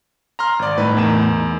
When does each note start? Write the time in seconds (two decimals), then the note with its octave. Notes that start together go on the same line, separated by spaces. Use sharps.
0.39 A#5 C6 F6
0.59 G#1 D5
0.78 A2 D#4 B4
0.97 E2 A#4 E7